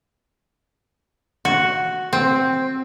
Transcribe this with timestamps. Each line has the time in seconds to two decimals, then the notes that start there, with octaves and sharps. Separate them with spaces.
1.45 F#4
2.13 C4